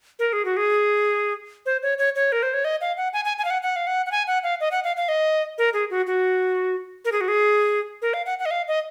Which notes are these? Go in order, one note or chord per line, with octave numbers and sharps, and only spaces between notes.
A#4
G#4
F#4
G#4
C5
C#5
C#5
C#5
A#4
C5
C#5
D#5
F5
F#5
G#5
G#5
G#5
F5
F#5
F#5
F5
F#5
F#5
G#5
F#5
F5
D#5
F#5
F5
F5
D#5
A#4
G#4
F#4
F#4
A#4
G#4
F#4
G#4
A#4
F5
F#5
F#5
D#5
F5
D#5